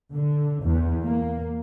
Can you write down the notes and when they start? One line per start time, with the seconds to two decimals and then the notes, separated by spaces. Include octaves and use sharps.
0.13 D3
0.62 E2
1.04 A#3